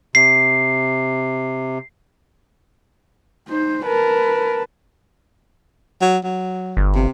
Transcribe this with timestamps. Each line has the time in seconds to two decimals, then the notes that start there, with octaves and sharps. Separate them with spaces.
0.15 C3 C7
3.48 D#4 C5
3.86 A#4 B4 A5
6.01 F#3
6.24 F#3
6.77 G1
6.95 C3